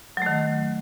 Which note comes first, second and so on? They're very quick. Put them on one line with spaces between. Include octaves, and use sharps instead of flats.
F#3 A3 D#3